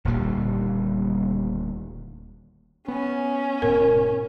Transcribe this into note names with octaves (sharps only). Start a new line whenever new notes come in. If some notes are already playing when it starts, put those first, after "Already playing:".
D#1 D2 A#2 G3
B3 C#4
D1 G#2 B2 A#4